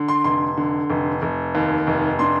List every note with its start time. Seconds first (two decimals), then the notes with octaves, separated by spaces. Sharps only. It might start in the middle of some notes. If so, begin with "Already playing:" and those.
Already playing: D3
0.08 C6
0.24 F1 C6
0.57 D3
0.90 F1
1.22 F1
1.55 D#2
1.87 F1
2.19 D4 C6